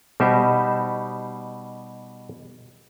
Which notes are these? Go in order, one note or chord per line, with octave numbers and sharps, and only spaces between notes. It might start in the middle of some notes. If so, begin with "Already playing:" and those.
B2 G3 D#4 G4 C5 E5